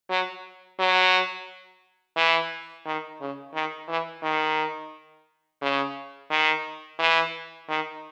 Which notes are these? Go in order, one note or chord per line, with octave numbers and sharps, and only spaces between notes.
F#3
F#3
E3
D#3
C#3
D#3
E3
D#3
C#3
D#3
E3
D#3